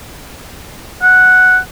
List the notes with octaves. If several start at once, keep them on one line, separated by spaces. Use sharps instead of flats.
F#5